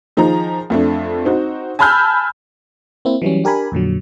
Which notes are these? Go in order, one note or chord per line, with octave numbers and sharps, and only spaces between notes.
D#3 F3 D#4 G#4 A#5
F2 A3 D4
C4 D#4 F#4
G#5 A5 B5 E6 F6 G6
A#3 C4 E4
E3 F#3 G3 C#4
D4 G4 A#4 G#5 B5
F2 A#2 D3 F#3